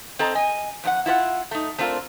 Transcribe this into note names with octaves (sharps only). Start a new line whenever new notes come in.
C4 A4 D#5 A#5
D#5 G#5
F2 D4 F#5
E4 F4 B4 F#5
A3 D#4
A3 C4 D4 F4 G4 A#4